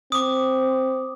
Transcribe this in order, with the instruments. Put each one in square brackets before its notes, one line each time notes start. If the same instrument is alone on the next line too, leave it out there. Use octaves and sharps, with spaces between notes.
[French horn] C4 [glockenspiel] D6 D#6